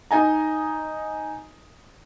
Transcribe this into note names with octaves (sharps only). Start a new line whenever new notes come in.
D#4 D#5 G#5 A#5